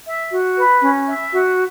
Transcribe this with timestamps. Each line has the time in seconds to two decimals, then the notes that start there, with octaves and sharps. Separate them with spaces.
0.06 E5
0.31 F#4
0.57 B4
0.82 C#4
1.07 E5
1.32 F#4